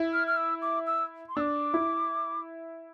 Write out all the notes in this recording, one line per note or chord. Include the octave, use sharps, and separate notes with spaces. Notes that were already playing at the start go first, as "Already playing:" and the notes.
Already playing: E4
F6
F6
E6
D6
E6
C6
D4 D6 E6
E4